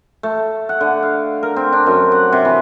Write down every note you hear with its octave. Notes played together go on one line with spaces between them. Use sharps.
A3
F#5
D3
F5
A#4
C4
D4
F#2
F#5
C3
E3